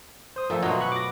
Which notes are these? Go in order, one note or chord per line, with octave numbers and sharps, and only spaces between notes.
C5 D#6
A#2 F3 A3 A4
B2 F#3 F4 F#4 D#5
B5 C#6 F#6
D6 A#6